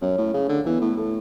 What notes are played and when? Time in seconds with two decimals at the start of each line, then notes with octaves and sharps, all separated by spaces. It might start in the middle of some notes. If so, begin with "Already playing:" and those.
0.02 F#2 C#4
0.18 A2
0.34 C#3
0.49 D3
0.65 E3 B3
0.81 A2
0.96 A2 A4